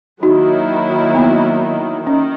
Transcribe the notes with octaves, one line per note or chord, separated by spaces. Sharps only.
D#3 F#3 A#3 D#4 E4 F#4
B3
D#3 C#4